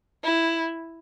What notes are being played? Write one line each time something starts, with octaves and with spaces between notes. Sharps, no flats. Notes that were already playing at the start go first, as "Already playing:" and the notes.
E4